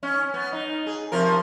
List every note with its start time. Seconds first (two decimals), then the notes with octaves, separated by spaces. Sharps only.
0.03 C#4
0.34 B3
0.53 D#4
0.86 G#4
1.12 C3 F3 A#4